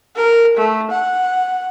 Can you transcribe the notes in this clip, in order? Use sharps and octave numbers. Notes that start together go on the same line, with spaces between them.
A#4
A3
F#5